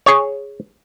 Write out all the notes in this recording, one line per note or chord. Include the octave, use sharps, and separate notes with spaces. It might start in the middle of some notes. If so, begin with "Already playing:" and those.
G#4 C#5